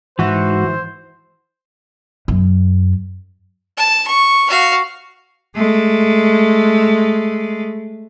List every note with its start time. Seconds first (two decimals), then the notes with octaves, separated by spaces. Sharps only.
0.19 G#2 E3 F#4 C5
2.28 F#2
3.77 A5
4.07 C#6
4.50 F#4 F5
5.56 G#3 A3